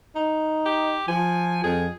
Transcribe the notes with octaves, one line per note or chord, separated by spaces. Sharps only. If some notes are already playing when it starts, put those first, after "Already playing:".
D#4
G4
F3 G#5
F2 G#4